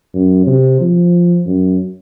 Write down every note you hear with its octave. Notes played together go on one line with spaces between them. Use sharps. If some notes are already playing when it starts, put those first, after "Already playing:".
F#2
C3
F3
F#2